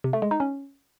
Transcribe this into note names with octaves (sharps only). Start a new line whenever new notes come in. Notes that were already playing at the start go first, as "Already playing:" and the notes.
C3
A3
G#3
D#4
C#4